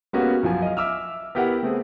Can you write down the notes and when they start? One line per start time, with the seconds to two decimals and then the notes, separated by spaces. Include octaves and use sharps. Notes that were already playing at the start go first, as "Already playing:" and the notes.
0.13 G#3 A#3 B3 C#4 F#4 G4
0.43 F#2 F3 G#5
0.62 D#5 F5
0.77 E5 D6 E6 F6
1.35 B3 E4 G4 A#4 F#5
1.63 A3 B3 C4 G#4